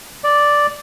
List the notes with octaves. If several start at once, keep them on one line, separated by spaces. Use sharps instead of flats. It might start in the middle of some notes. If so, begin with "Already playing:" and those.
D5